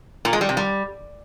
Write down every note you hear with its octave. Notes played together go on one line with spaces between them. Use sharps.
A#2
G#3
G3
C3
G3